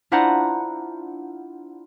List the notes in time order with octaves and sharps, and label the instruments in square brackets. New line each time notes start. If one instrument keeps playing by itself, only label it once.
[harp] D4 E4 F4 C5 F#5 A#5